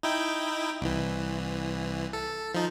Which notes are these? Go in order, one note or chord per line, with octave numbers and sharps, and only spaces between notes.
D#4 E4 G5
C2 E3
A4
F3 D#4